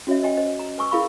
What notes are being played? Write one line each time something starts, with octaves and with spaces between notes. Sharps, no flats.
C#4 F#4 C#5 D#5 E5
D#5 G5 G#5
C5 D#5
A#5
B4 G#5 C#6 E6
E4 G#4 A#4 F5 B5 C#6